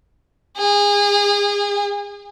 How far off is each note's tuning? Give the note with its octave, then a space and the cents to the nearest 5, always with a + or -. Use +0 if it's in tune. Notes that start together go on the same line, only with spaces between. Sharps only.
G#4 -30